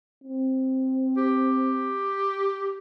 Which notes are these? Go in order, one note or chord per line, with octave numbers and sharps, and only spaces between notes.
C4
G4